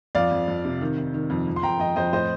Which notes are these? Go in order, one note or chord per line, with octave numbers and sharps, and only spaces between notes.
F2 D5 F5
F2
F2
C3
D#3
D#3
D#3
F2
F2
C6
F2 G5 A#5
F2 D#5 G5
F2 C5 D#5
A2 C5 D#5